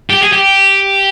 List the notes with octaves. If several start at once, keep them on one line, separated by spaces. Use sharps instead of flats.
G4
G#4
G4